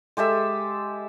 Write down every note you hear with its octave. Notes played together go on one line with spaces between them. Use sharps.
G#3 G4 A4 E5